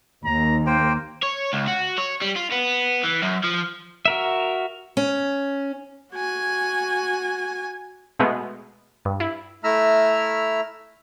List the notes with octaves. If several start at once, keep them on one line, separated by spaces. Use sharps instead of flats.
D#2 A#5
A#3 C5 G5
C#5
C#2
F#4
C#5
G3
F4
B3
E3
F#2
F3
F#4 A#4 E5
C#4
F#4 G#5
B2 G#3 A3 B3
G2
E4
A3 E4 E5 A#5 E6 F6